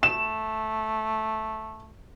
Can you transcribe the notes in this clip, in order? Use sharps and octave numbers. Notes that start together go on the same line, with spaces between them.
A3 E7